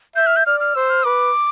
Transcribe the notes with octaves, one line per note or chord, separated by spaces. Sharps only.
E5 G6
F6
G6
D5 F6
F6
C5 E6
F6
B4 D6